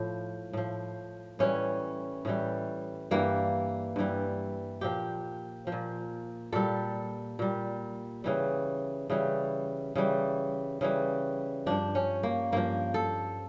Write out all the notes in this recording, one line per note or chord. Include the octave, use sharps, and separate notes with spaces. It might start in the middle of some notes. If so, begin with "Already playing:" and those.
Already playing: A2 F3
A2 F3
A2 E3 G3 C#4
A2 E3 G3
G2 E3 G3 A#3
G2 E3 G3
A#2 F3 G4
F3
A#2
A#2 G3 A4
A#2 G3
C#3 E3 G3
C#3 E3 G3
C#3 E3 G3
C#3 E3 G3
G2 F3 D4
C#4
A#3
G2 F3 A#3
A4